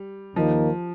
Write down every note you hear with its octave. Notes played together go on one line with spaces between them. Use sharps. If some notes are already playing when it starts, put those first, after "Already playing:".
Already playing: G3
D#2 D#3 F3 A#3 D#4